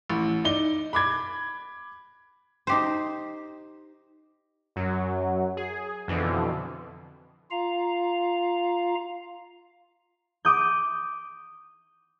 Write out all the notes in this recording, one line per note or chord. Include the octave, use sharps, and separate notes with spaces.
A1
D#4 D5 G7
B5 D6 G#6
D#4 G4 C5
F#2 F#3
G#4
F2 B2 D3 E3
F4 F5 A#5
D6 D#6 G6